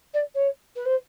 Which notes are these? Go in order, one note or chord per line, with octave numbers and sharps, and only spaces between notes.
D5
C#5
B4
C5